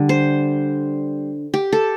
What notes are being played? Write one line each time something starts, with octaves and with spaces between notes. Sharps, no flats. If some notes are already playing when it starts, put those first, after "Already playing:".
Already playing: D3 G3
C5
G4
A4